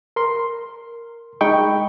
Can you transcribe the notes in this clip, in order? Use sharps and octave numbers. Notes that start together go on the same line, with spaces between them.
A#4 C6
G#3 D#4 G5 B5 C#6